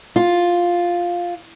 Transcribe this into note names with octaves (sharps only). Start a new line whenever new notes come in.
F4